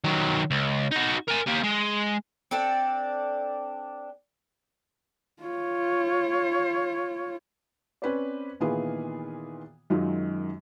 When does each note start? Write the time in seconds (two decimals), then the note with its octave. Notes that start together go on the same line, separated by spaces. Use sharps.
0.04 D#3 F#3
0.51 C#2
0.92 D#4 F#4
1.28 A#4 G#5
1.48 A#3 G4
1.64 G#3
2.51 C4 D4 A4
5.43 F4 C#5
8.02 C4 C#4 B4 C5 D5
8.60 A#2 D#3 E3 B3 F4 G#4
9.90 F#2 D#3 F#3 G#3 D#4 F4